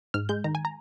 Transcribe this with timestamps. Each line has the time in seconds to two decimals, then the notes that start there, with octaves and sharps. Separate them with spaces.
0.14 G#2 F6
0.29 G#3 G6
0.44 D#3 A#5
0.55 G#5
0.65 A#5